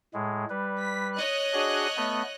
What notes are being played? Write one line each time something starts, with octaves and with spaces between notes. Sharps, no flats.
A2 G#3
G3 B4
B6
C#5 D#5 F#6
D4 F#4 G#4
A3 B3